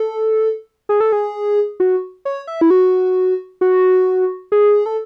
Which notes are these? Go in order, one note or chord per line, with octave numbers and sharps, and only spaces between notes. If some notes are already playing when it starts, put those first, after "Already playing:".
Already playing: A4
G#4
A4
G#4
F#4
C#5
E5
E4
F#4
F#4
G#4
A4